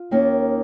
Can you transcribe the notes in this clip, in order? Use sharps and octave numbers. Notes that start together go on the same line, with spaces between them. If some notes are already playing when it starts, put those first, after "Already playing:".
Already playing: F4
D#2 D#3 A#3 C#4